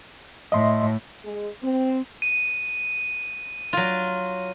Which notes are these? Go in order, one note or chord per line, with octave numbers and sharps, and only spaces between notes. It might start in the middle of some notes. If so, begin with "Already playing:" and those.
A2 D#5 E5 C6
G#3
C4
D#7
F#3 F4